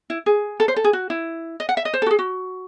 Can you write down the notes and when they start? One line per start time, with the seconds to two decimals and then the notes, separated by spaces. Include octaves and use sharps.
0.10 E4
0.26 G#4
0.60 A4
0.68 C5
0.76 A4
0.84 G#4
0.93 F#4
1.10 E4
1.60 D#5
1.69 F#5
1.77 E5
1.85 D#5
1.94 C5
2.02 A4
2.06 F#4
2.11 G#4
2.19 F#4